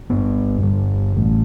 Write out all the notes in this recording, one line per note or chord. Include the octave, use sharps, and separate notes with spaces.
G1 G2 B3
G1 G2
A1 A2